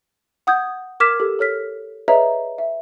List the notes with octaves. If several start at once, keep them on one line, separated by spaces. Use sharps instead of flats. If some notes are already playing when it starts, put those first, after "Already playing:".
F#5 D#6 G6 G#6
A#4 D6 F6 G#6 B6 E7
G4 A4
A4 C#5 F6 B6
G#4 B4 C#5 D#5 E5 A#5
E5